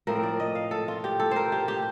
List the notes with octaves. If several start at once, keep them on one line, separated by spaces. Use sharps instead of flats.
A2 F3 C4 A#4
D5
D#5
F5
A4
F4
G4
A4
A#4 C5
G4
G4